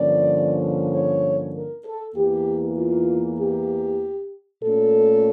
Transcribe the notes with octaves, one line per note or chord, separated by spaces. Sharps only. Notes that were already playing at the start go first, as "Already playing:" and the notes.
Already playing: G2 D3 F3 A#3 C#4 D5
C#5
A#4
A4
E2 E3 A#3 G4
F4
G4
A#2 A3 C#4 A4